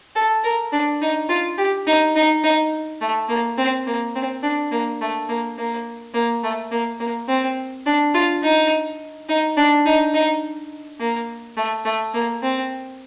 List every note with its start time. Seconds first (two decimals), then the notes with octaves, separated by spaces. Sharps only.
0.16 A4
0.44 A#4
0.73 D4
1.02 D#4
1.29 F4
1.58 G4
1.87 D#4
2.16 D#4
2.44 D#4
3.01 A3
3.29 A#3
3.58 C4
3.87 A#3
4.15 C4
4.43 D4
4.72 A#3
5.01 A3
5.29 A#3
5.58 A#3
6.14 A#3
6.43 A3
6.72 A#3
7.00 A#3
7.29 C4
7.86 D4
8.14 F4
8.43 D#4
9.29 D#4
9.57 D4
9.86 D#4
10.14 D#4
11.00 A#3
11.57 A3
11.85 A3
12.14 A#3
12.43 C4